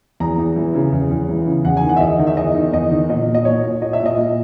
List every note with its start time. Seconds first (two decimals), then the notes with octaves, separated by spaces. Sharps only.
0.20 E2 A#5
0.38 E2
0.56 E3
0.75 C#3
0.92 E2
1.11 E2
1.29 E3
1.47 C#3
1.65 E2 F#5
1.77 G#5
1.83 D#3
1.89 F#5
1.97 E5
2.00 E2 D#5
2.19 D#3
2.27 E5
2.37 E2 D#5
2.55 D#3
2.73 E2 D#5
2.91 D#3
3.09 A#2 D#5
3.27 A#2
3.35 D#5
3.45 A#2 C#5
3.63 A#2
3.82 A#2 D#5
3.93 E5
3.99 A#2
4.06 D#5
4.18 A#2